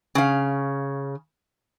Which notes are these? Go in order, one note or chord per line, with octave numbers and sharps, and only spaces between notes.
C#3 F5